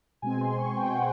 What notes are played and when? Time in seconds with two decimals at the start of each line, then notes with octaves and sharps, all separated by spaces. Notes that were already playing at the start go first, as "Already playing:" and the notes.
0.22 B2 G#3 C4 G#5
0.41 C6
0.58 C#6
0.77 G5
0.94 F#5